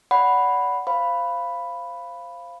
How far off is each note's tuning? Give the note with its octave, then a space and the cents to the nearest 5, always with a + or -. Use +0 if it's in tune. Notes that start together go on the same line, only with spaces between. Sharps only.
D5 -40 F#5 +0 B5 +0
C5 +15 F5 -10 B5 +0